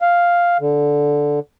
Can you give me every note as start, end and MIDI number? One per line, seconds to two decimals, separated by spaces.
0.02 0.58 77
0.60 1.40 50